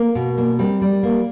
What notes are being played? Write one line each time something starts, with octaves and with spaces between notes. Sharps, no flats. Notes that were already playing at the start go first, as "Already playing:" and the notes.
Already playing: A#3
B2
A#3
G3 C4
G3
A#3